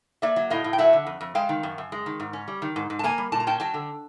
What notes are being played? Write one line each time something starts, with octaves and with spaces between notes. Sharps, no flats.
A#3 D5 E5
F#3
A2 D#5 F5
A2
G5
F#3 E5 F#5
D3
F2
F2
G#3 F5 G5
D#3
F#2
F#2
G#3
D#3
G#2
C#4
G3
D#3
G#2
G#2
A5
A#3 G#5 A#5
G3
A#2 A5
A#5
C#4 G5 A5
F#3 G5 A5
D3